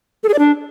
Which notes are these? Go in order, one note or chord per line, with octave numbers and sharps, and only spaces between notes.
A4
G#4
D5
D4